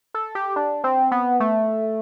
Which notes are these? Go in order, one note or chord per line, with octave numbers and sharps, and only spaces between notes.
A4
G4
D4
C4
B3
A3